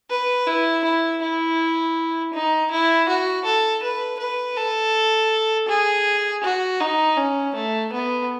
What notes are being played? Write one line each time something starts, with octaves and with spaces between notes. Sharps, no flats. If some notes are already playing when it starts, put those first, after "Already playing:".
B4
E4
E4
E4
D#4
E4
F#4
A4
B4
B4
A4
G#4
F#4
D#4
C#4
A3
B3